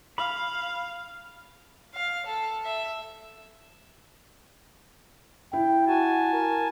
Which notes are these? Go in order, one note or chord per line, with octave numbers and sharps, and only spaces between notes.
F5 B5
F5
A4
E5
E4 G5
F#4 G#5 A5
A#4